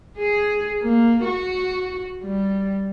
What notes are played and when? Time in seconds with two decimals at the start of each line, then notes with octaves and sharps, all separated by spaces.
0.18 G#4
0.82 A#3
1.24 F#4
2.24 G3